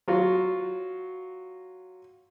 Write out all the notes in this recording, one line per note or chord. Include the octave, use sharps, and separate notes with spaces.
F#3 F4 F#4